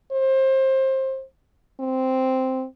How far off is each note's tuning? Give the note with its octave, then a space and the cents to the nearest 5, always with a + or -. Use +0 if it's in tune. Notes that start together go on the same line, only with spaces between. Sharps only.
C5 +25
C4 -5